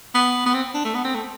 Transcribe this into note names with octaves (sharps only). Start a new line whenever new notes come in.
B3
B3
C4
D4
A3
B3
C4
A3